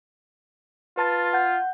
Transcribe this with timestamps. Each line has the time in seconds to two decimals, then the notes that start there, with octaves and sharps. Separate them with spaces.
0.97 F4 B4 A5 A6
1.33 F#5 G6